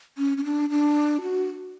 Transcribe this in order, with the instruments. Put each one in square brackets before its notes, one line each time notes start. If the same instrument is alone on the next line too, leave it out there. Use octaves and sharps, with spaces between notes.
[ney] C#4
C#4
D4
D4
F#4